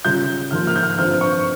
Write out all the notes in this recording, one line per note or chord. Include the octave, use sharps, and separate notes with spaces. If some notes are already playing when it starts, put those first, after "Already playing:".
C#3 G3 C#4 F4 G6
G#2 F3 A#3 F4 F6
F6
G6
F6
G2 F3 C4 F4 F6
C#6